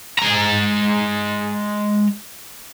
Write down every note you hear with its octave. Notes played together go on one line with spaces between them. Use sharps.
G#3 A#5